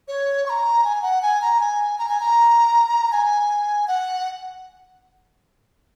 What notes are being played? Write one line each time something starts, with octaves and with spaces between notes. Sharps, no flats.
C#5
C#6
A#5
G#5
F#5
G#5
A#5
G#5
A#5
G#5
A#5
G#5
F#5